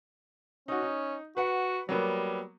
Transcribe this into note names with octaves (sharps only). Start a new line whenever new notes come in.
C#4 D#4 F#4
D#4
F#4 B4 F#5
F#3 G3 A#3 B3